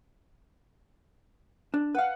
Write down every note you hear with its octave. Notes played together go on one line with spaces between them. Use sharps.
D4
B4 F5 F#5